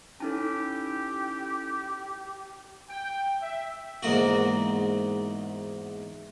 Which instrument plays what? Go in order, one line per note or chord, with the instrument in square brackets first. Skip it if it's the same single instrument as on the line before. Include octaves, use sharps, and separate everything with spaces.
[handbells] C#4 E4 A4 [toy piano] D#4 A5 [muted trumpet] G4
[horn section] G5
E5
[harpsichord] E2 G#2 A#3 F#4